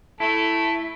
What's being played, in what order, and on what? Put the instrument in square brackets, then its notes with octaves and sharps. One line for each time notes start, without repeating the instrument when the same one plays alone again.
[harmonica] A3 A4 [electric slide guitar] E4